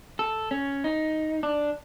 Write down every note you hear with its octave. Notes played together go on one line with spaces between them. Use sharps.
A4
C#4
D#4
D4